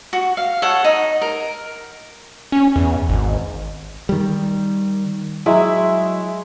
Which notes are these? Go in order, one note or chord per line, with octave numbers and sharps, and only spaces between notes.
F#4
F5
A4 C#5 F#5
D#4
A#4
C#4
E2
G#1
D#3 G3
F#3 G#3 E4